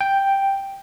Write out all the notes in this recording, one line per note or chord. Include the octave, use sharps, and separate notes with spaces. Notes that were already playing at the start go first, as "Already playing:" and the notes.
G5